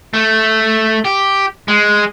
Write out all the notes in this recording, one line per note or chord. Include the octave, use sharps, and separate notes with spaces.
A3
G4
G#3